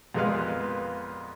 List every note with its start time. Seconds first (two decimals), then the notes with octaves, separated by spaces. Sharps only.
0.14 F2 A#2 G#3 B3 B4 F5